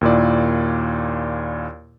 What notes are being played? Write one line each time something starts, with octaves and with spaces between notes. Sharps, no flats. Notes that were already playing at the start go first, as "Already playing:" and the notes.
D#2 A#2 E4 D5